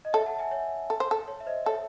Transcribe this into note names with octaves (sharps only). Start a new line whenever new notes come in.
D#5
A4 C#5 E5
F#5 A5
E5 G#5
C#5 E5
A4
C5
A4
C#5
E5
C5 D#5
A4 C#5 E5